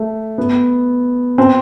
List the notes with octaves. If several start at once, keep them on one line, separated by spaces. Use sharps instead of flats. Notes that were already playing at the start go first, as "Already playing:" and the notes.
Already playing: A3
B3
C4